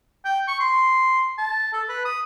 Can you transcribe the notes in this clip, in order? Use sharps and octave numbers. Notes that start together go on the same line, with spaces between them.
G5
C#6
C6
A5
A4
B4
D#6